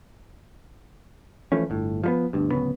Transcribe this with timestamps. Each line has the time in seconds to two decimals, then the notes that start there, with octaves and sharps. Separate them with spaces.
1.52 E3 F3 A3 C#4
1.70 G1 A2
2.04 F3 G3 B3
2.33 G1 D2 G2
2.50 D1 G2 C#3 B3